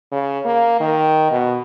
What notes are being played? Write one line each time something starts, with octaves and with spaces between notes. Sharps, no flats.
C#3
A#3
D#3
B2